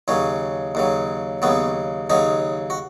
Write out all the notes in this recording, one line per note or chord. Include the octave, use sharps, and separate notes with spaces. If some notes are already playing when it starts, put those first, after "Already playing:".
D#2 C#3 F#3 C#4
D#2 C#3 F#3
D#2 C#3 F#3 B3
D#2 C#3 F#3 D#4
F#4